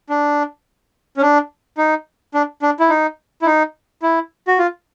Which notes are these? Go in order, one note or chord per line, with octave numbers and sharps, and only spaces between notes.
D4
C#4
D4
D#4
D4
D4
E4
D#4
E4
D#4
E4
F#4
F4